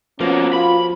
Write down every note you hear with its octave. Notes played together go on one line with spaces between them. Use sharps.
F3 A#3 B3 C#4 F#4
F4 B5